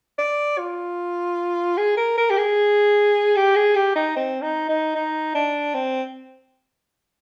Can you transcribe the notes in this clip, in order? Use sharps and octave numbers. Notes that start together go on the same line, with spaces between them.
D5
F4
G#4
A#4
A#4
G4
G#4
G4
G#4
G4
D#4
C4
D#4
D#4
D#4
D4
C4